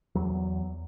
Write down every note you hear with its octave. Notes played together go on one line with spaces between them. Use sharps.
E2 F#3